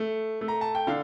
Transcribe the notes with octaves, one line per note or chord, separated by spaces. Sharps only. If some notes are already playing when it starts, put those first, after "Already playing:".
Already playing: A3
A3
A#5
A5
G5
D3 F5